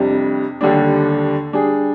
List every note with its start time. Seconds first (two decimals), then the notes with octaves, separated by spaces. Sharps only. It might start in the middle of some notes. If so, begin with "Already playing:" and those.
Already playing: F2 C3 G3 D4
0.61 D#2 D3 G3 D4
1.53 G3 D4 G#4